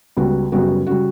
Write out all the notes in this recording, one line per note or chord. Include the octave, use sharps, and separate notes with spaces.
C#2 C#3 G3 B3 F#4
F#2 C#3 G3 B3 F#4
C#3 G3 F#4